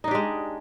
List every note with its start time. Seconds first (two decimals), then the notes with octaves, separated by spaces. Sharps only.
0.04 D#4
0.08 D4
0.11 G4
0.15 G#3